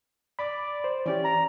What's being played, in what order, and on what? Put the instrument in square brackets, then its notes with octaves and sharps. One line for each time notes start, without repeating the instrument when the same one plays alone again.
[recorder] D5 [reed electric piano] B5 D6
[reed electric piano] C5
[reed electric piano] E3 C#4 G4 [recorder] D5
[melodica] A#5